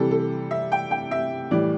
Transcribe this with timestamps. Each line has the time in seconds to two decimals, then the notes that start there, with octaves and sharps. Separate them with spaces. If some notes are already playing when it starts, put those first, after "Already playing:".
Already playing: C3 E3 G3 A4
0.11 A4
0.51 E5
0.72 G5
0.91 G5
1.11 E5
1.51 A2 E3 G3 D5